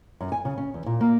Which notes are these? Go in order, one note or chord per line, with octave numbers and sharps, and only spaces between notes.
F#2
G#5
C#3
C#4
E2
A#2
A#3